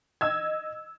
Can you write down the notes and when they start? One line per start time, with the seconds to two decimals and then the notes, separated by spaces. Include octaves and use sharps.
0.21 D#5 E6 G#6